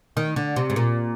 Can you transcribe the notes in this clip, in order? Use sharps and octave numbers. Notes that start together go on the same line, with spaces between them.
D#3
D3
C3
G#2
A#2